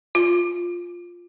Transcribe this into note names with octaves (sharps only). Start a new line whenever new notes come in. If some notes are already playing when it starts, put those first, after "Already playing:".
F4